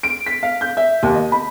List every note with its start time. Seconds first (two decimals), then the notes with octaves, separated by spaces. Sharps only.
0.03 D7
0.26 B6
0.43 F5
0.61 G6
0.77 E5
1.03 D#2
1.15 D#5
1.32 B5